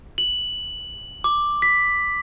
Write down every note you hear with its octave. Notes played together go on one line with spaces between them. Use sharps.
F#7
D6
B6